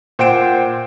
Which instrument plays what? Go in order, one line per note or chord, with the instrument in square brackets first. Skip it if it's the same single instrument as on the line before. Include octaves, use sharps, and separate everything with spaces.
[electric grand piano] A#2 C5 F#5 G5 D7 E7